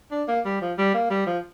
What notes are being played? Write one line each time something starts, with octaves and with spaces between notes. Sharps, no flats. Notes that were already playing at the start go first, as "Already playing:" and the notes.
D4
A#3
G3
F3
G3
A#3
G3
F3